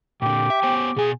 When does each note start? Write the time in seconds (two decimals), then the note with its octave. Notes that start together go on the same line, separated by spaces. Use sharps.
0.22 A#2 D3 G4 G5
0.50 E5
0.63 B3 C5 G#5
0.96 B2 G#4 G#5